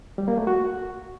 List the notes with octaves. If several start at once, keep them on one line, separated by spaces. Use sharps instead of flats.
G3
A#3
A3
F#4